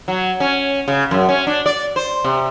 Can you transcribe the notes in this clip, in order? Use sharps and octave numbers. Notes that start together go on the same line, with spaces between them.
F#3
C#4
C#3
F#2
C#4
D4
D5
C5
C3